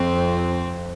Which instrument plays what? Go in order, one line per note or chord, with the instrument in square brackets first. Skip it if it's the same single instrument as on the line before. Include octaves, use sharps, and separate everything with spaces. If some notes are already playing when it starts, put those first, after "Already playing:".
Already playing: [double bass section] F2 [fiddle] C4